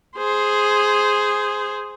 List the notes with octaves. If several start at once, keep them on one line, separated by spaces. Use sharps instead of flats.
G#4 C5